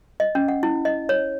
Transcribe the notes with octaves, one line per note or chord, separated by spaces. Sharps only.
D#5
C#4
F#5
E4
D#5
C#5